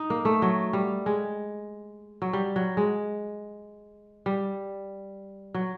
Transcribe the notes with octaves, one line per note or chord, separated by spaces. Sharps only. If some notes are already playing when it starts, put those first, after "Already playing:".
Already playing: D#4
A#3
A3
F#3
G3
G#3
F#3
G3
F#3
G#3
G3
F#3